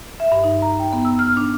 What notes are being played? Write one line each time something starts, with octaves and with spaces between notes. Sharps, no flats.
E5
G2
D#4
A#5
G5
B3
E6
F6
D4